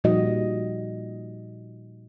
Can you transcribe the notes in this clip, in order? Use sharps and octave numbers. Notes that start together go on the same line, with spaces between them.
A#2 F3 G3 D#4 F#4 D#5